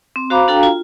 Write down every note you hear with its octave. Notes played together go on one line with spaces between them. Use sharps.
C4
F#4 C5 F5 A#5 B5 D6
D4 F#4 A4 F5 G5 A#5
F4